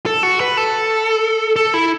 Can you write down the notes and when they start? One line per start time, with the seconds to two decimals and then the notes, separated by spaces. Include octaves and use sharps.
0.06 A4
0.23 F#4
0.40 B4
0.57 A4
1.56 A4
1.74 E4